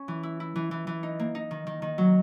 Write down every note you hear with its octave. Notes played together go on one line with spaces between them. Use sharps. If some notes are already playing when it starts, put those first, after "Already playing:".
Already playing: C#4
E3
E4
E4
E3
E3
E3
D#4
A#3
D#4
D#3
D#3
D#3
F#3